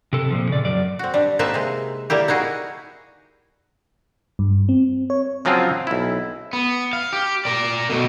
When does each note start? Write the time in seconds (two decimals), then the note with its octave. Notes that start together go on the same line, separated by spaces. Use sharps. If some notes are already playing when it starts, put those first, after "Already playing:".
0.13 C3 A4
0.30 A#2 F3
0.49 C#3 D5
0.65 F#2 D5
0.99 C4 F#4
1.14 G3 D4
1.39 A#3 C4 D#4 B4 E5 A5
1.54 C3 G#3
2.10 G3 A#3 E4 G4
2.28 D#4 E4 F#4 G#4
4.39 G2
4.69 C4
5.10 C#5
5.45 C#3 F3 F#3 C4 F4 G#4
5.87 B1 E4
6.53 B3
6.93 F5
7.13 G4
7.45 A#4 D5
7.90 B2 A3